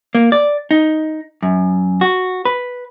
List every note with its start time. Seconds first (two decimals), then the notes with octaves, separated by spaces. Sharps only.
0.15 A#3
0.32 D5
0.71 D#4
1.43 F#2
2.01 F#4
2.45 B4